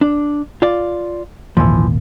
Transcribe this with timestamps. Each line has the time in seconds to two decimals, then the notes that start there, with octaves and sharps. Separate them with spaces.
0.01 D4
0.62 F4 D5
1.57 G#1 D#2 A#2 E3 F3